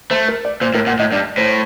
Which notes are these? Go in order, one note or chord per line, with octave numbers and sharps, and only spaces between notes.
A3 C5
A#4
D5
A#2 C5
A2 A#4
A#2 F#5
A2 D#5
G2 D5
A2 C5